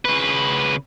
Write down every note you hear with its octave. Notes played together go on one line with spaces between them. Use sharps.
C#3 B4